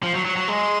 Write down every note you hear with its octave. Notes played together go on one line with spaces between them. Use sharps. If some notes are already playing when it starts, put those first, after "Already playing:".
F3
F#3
F#3
F#3
G#3